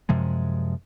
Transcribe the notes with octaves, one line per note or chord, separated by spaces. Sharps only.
F#2 C3 F3 G#3